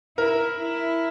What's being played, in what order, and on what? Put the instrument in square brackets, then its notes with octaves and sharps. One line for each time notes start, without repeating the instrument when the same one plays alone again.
[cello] E4 [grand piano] A#4
[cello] E4